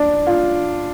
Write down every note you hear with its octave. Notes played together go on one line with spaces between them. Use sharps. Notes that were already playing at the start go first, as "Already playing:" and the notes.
Already playing: D4
F4